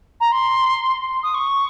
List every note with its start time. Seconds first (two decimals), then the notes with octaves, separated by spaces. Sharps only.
0.20 A#5
0.32 C6
1.23 D#6
1.34 C#6